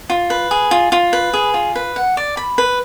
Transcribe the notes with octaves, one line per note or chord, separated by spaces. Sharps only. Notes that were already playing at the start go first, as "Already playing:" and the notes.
F4
B4
G#4
F4
F4
B4
G#4
F4
B4
F#5
D5
B5
B4